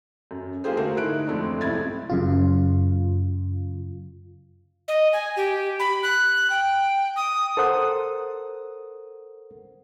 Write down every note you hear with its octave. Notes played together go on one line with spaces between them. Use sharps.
F#2
G#3 A#3 F4 G4 G#4 C5
D3 A3 F#4 A#4 C5
D#4 E4 F#6 D7
F2 G#3 A3 C4 D4
B1 F2 C3 E4 G#6 A6
F#2 C#3 F4
D#5
G#5
G4
B5
F#6
G5
D#6
A4 A#4 C5 F#5 D#6